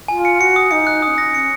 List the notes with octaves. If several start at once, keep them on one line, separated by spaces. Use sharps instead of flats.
F4 G#5
C#7
F#4 C#7
D#6
D#4 C#7
F#6
D#4 D#6
C#4
A#6
C#4 C#7